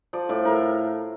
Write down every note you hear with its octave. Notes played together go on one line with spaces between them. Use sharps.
F3 D5
A2 D5
A2 A#4